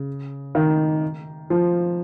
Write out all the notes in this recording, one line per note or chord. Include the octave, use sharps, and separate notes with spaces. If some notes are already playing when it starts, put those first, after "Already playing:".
Already playing: C#3
D#3
F3